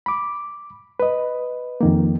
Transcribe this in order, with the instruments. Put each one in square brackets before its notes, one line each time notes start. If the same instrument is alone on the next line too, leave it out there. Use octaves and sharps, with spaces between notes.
[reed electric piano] B5 D6
B4 D#5
F2 D#3 A#3